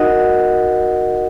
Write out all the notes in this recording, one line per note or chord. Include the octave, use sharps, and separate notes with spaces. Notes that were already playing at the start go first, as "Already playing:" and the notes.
Already playing: D#4 F#4 A#4 D#5 F#5